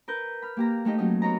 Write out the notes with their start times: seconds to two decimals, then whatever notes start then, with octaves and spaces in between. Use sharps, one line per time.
0.08 A#4 B4 G6
0.42 B5 F6
0.57 A#3 G4 A#5
0.85 A3 D#4 G4 D#5
0.98 F#3 C#4 D#4 D#5
1.22 B3 A#4 C#5 D#5 A#5